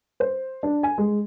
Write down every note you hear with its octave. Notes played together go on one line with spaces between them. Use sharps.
C5
D4
G#5
G#3